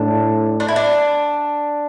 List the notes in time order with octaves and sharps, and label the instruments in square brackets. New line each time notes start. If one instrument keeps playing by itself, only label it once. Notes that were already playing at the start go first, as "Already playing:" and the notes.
Already playing: [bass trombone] A2 [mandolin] D4
[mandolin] D4
E4
D4